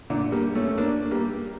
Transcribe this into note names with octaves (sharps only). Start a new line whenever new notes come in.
A#2 D3
G3 A#3
A3 C#4
A#3 D4
G3 A#3